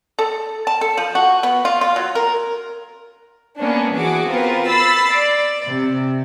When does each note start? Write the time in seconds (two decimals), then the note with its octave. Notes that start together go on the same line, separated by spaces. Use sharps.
0.19 A4
0.67 A5
0.81 A4
0.97 F3
1.15 F#4
1.43 B3
1.65 F4
1.81 F4
1.96 F#3
2.15 A#4
3.59 A#3 B3 C#4 D4
3.95 E3 F#4 G#4 D6
4.28 B3 C4 F4 A#4 B4
4.66 B5 E6 A6 C7
5.11 D5
5.65 C3